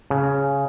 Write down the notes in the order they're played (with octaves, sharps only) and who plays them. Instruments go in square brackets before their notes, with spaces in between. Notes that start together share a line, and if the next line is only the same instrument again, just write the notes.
[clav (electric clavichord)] C#3